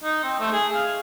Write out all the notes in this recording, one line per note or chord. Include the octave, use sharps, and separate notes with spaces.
D#4
C4
A3
G#4
F5